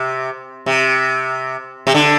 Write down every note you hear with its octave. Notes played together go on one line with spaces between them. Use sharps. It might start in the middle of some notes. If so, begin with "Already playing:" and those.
Already playing: C3
C3
C3
D3